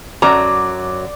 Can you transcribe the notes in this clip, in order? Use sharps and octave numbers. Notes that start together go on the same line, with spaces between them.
F#2 F#3 D5 A#5